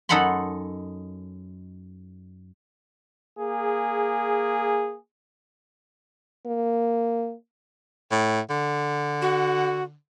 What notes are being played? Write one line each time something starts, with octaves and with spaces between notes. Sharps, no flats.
F#2 D#4 A4 F#5 B5 C6
A#3 G#4
A#3
A2
D3
F#4